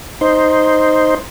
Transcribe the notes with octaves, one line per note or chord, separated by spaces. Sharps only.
D#4 C5